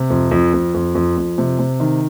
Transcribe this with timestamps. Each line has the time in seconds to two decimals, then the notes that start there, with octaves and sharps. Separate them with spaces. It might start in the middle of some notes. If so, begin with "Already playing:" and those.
Already playing: C3
0.10 F2
0.31 F2
0.54 F2
0.74 F2
0.95 F2
1.17 F2
1.38 C3
1.59 C3
1.80 D#3